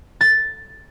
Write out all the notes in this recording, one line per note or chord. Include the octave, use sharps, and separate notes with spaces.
A6